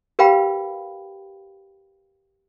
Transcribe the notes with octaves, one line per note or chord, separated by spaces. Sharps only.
G4 A#4 B4 F5 G5 B5